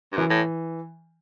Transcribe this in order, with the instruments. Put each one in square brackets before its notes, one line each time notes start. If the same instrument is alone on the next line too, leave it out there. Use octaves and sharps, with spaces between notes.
[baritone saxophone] G2
[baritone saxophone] F#2 [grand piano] E3
[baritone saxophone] A2